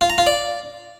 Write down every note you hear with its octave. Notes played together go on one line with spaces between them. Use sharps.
F4
A#5
F4
D5